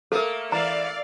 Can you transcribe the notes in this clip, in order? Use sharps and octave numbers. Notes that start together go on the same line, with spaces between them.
A3 A#3 A4 A#4
E3 D5 F5 A#5